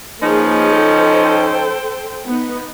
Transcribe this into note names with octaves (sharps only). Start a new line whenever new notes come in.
F3 A#3 C#4 D#4 G#4 B4
A4 C5 G5
B3 D#4